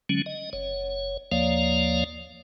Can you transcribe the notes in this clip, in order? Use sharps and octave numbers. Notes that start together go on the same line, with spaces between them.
D3 F#3 G#3 C#4
D#5
F#1 C#5
D#2 F3 A#3 C#5 D5 F5